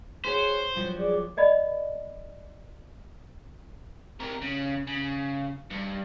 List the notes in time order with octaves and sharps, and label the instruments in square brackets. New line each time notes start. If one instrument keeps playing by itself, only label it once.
[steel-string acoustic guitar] F#4 G#4 C#5 [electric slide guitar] C5
[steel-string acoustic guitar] G2 F3 F#3
[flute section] G#4 D5 D6
[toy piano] A#4 D5 D#5 B5
[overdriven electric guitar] C3 A#4
C#3
C#3
G2